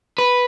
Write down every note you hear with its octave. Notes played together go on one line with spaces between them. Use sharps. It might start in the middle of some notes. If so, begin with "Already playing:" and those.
B4